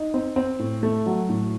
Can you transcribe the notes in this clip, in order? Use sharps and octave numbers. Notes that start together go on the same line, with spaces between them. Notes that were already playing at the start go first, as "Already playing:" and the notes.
Already playing: D#4
C4
C4
A2
A3
F#3
A2